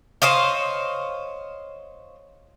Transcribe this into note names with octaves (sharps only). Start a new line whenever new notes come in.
C5 C#5 D#5 F5